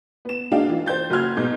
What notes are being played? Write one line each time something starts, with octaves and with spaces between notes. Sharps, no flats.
B3 E7
G#3 D4 D#4 F#4 F5 G5
E3 F4
C5 G5 G6 A6
F#1 F#4 C6 F6 G#6
G#2 B2 G6